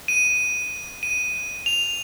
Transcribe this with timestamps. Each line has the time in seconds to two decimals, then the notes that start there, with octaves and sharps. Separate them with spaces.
0.08 D#7
1.03 D#7
1.66 F7